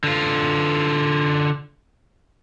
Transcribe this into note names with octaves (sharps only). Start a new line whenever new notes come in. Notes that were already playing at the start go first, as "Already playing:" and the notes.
D3 F4